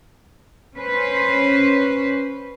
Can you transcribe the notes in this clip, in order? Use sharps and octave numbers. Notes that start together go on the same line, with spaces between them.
C#4 B4 C5